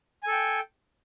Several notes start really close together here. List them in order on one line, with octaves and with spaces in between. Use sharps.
G#5 A4 G5